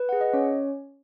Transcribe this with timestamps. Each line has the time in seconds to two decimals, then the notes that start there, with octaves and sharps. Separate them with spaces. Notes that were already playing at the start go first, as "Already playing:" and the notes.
Already playing: B4
0.09 G#4 F#5
0.21 D#5
0.33 C#4 C#5